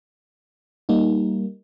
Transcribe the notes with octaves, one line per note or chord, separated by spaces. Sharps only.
G3 A#3 D#4